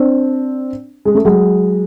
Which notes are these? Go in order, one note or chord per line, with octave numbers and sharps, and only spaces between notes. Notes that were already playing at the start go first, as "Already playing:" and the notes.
Already playing: C4 D4
G#3
A3
F#3 G#3